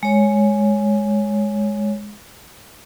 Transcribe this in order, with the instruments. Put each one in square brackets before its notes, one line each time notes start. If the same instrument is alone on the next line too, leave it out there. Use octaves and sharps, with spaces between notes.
[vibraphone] G#3 C#5